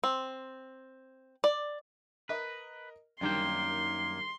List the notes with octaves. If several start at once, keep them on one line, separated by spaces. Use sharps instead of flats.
C4
D5
A#4 B4 D#5
F#2 D#3 G3 A#3 D4 G5 C6